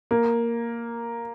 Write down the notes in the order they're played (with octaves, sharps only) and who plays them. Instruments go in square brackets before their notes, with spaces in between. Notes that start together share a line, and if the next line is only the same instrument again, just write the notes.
[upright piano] A#3